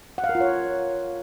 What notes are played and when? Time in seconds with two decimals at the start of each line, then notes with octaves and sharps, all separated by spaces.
0.18 F#5
0.24 F5
0.29 A#4
0.35 F4
0.41 C#5